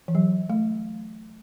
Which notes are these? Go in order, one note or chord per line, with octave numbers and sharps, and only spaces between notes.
E3
F#3
A3